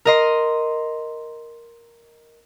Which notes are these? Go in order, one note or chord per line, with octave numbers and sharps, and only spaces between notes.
A#4 D#5 C6